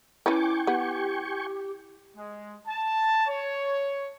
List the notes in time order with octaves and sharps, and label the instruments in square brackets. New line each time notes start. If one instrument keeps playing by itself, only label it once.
[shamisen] C#4 B4 [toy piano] E4 [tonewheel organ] G5 G#5 C#6 [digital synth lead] D6
[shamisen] B3 [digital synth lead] G4
[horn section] G#3
A5
C#5